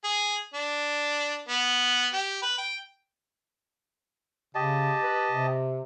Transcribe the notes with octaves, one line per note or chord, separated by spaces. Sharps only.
G#4
D4
B3
G4
B4
G5
C#3 G4 D#5 A5
B4
C3